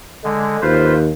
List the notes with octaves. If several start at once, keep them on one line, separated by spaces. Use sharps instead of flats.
D3 G#3
D#2 F4 B4 C5